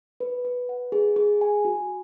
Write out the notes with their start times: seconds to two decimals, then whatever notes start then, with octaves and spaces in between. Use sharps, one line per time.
0.20 B4
0.45 B4
0.69 F#5
0.92 G#4
1.16 G#4
1.41 G#5
1.65 F#4